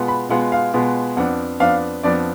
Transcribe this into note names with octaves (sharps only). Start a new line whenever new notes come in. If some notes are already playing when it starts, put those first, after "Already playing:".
Already playing: B2 G#3 B3 F4
B5
B2 G#3 B3 F4 F#5
F5
B2 G#3 B3 F4
F2 F3 B3 D4 F#5
F2 F3 B3 D4 F5
F2 F3 B3 D4 D5